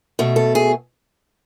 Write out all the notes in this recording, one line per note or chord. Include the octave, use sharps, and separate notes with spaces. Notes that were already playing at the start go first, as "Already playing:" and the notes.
B2 A3
A4
G#4